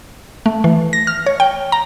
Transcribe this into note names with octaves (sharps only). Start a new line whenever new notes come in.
A3
E3
A#6
F6
C#5
G5
A#5